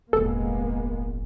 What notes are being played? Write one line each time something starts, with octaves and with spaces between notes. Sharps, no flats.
E1 A1 G#3 A#3 B3 A4